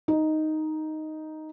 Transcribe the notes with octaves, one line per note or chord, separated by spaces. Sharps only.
D#4